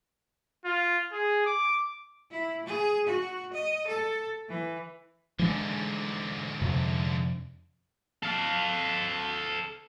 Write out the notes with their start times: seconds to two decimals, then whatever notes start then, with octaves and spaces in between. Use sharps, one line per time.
0.65 F4
1.12 G#4
1.46 D6
2.31 E4
2.66 G#4
3.07 F#4
3.53 D#5
3.87 A4
4.48 E3
5.39 G#2 D3 E3 G#3 D4
6.62 F2 C3
8.22 A4 F5